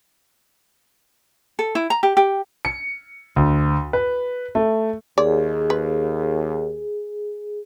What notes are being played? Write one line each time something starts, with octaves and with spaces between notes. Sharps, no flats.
A4
E4
A#5
G4
G4
C#7
D2
B4
A3
D#2 G#4 D5
B4